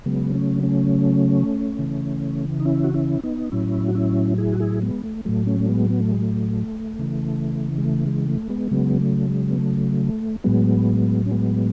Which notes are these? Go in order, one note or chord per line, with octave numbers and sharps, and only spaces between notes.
C#3 F#3 G#3 B3
A3 C#4
A3 C#4
C#3 E3
D#4
C#4 E4
F#4
C#4 E4
B3 D#4
A2 F#3 C#4 E4
F#4
C#4 E4
E4 G#4
F#4
E4 G#4
G#3 B3
A3
A2 F#3 A3
A3 C#4
A3
G#3 B3
B3
A3
G#3
A3
C#3 E3
G#3
A3
G#3
A3
G#3 B3
A3
C#3 F#3 G#3 B3
A3
G#3
B3
A3
A2 F#3 G#3 B3
C#4
G#3 B3